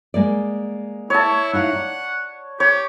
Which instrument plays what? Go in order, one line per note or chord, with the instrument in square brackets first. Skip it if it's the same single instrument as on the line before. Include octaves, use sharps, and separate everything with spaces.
[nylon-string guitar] G#3 A#3 D5
[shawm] E4 [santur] C#5 A5
[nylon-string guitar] D#4 E4 F5 [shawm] F#5
[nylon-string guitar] D5
[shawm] G4 [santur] C#5